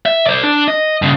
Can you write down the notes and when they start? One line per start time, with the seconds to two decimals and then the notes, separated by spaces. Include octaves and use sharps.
0.06 E5
0.27 C5 D5
0.43 D4
0.68 D#5
1.02 G2 C#3